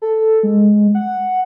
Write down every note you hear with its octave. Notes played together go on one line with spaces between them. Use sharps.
A4
G#3
F#5